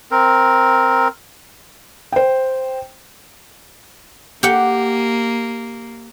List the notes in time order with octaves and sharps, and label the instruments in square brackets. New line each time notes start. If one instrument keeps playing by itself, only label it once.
[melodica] C4 A#4
[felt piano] C5 G5
[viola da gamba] A#3 [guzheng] G4 F#5